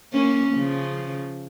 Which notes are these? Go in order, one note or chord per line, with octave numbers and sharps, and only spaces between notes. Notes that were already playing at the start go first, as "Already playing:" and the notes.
A#3 C#4
C#3 F3